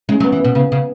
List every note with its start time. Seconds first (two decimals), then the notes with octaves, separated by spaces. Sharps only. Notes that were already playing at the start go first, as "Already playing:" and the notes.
0.09 G#3 C#4
0.20 F#3
0.24 B3
0.32 E3
0.40 B2 B3
0.55 C#3 B3
0.72 C#3